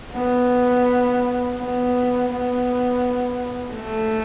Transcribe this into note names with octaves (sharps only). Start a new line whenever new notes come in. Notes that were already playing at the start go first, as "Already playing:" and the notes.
B3
B3
B3
A3